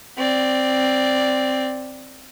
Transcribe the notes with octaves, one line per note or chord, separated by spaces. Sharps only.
C4 D5